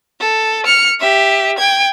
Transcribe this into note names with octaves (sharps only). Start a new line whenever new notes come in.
A4
F6 C#7
G4 E5
G5 G#6